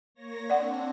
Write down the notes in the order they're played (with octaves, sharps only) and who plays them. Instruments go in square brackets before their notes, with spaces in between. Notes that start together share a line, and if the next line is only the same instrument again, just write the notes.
[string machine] A#3 C#5 A#6
[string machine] C4 D4 [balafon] D5 F#5